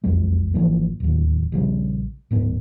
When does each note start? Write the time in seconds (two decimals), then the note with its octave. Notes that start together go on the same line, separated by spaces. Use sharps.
0.04 E1 B1 F2 G#3
0.54 G#1 E3 F3 A#3
1.00 D1 D#2
1.52 A#1 C#3 G3
2.31 D1 G#2 B3